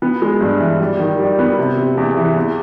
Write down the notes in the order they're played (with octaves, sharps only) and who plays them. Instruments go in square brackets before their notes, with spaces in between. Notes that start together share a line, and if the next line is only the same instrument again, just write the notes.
[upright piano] B3
G#3
G2
E3
G3
D#3
G3
B3
C3
C3
E2
E3
E2